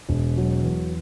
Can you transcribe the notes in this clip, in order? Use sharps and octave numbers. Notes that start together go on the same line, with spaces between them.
E1
F#3
E2